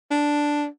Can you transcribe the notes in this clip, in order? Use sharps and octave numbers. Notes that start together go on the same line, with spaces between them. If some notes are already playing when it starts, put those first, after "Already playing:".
D4